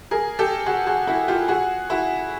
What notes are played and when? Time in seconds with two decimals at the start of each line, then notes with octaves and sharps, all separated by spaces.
0.11 G#4 A#4
0.39 G4 A4
0.66 F#4 G#4
0.87 F#4 G#4
1.07 E4 F#4
1.28 F4 G4
1.48 F#4 G#4
1.90 E4 F#4